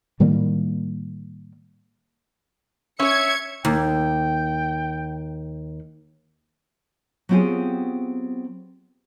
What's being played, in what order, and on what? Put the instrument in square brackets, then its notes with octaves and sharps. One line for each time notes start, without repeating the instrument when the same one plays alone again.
[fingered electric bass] A2 D#3 G3 A#3
[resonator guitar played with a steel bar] C#4 C#5 [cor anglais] E5 [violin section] G#6 C#7
[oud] D#2 [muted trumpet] G5
[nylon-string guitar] F#3 B3 C4 F4 G4 G#4